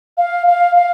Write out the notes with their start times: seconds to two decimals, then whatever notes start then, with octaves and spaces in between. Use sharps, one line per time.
0.18 F5
0.47 F5
0.76 F5